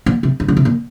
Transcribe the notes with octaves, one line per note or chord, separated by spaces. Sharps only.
A#2
C3
D#3
D3
C3
A#2